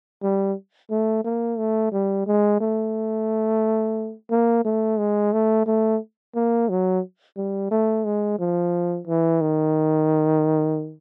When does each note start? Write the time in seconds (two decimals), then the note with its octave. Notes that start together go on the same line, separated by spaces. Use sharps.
0.23 G3
0.91 A3
1.25 A#3
1.58 A3
1.93 G3
2.27 G#3
2.61 A3
4.31 A#3
4.65 A3
4.99 G#3
5.33 A3
5.67 A3
6.35 A#3
6.69 F#3
7.37 G3
7.71 A3
8.05 G#3
8.39 F3
9.07 E3
9.41 D#3